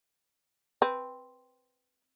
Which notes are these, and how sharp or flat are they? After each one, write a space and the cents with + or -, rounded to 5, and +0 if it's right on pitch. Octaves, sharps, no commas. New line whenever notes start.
C4 +0 B4 +0